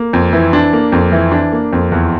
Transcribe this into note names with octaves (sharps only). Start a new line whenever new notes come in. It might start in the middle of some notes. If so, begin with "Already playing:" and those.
Already playing: A#3
F2
E3
D4
A#3
F2
E3
D4
A#3
F2
E2